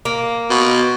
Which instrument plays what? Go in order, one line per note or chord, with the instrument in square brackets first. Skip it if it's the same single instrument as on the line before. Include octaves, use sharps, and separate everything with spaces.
[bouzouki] A#3
[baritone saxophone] B2